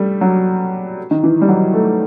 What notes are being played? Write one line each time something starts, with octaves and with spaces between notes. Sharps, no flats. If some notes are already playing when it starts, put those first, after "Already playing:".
Already playing: G3 A3
F#3
D#3
E3
G3
F#3
A3